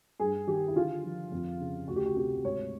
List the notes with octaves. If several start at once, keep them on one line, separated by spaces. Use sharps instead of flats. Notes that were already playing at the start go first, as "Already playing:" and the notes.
G2 G#4
D#3 G4
E4
D3 F4
F3
F2
C#3
D2 F#4
G4
F#4
C3 G4
G#2 C#5